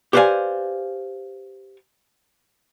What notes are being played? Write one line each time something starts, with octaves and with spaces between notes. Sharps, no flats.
G4 B4 C5 D5 F5 G#5